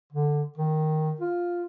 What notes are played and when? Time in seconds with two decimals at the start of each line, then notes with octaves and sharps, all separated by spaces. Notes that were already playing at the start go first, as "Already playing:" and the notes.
0.12 D3
0.58 D#3
1.20 F4